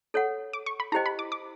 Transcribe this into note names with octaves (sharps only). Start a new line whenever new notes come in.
A4 C#5 F#5
D6
C#6
B5
E4 G4 C5 D#5 G5 A#5
B5
D6
D6